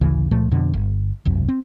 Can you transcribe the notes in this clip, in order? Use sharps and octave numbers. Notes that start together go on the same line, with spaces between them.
A1 D2 C#3 E3
C#2 A#2 F3 A3
F2 B2 D3
G1
E1 C2 F#2
C4